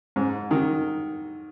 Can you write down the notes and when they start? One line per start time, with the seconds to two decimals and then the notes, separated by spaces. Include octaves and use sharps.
0.16 G#2
0.51 D#3